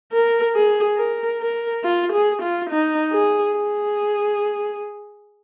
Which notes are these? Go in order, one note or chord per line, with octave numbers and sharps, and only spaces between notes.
A#4
G#4
A#4
A#4
F4
G#4
F4
D#4
G#4
G#4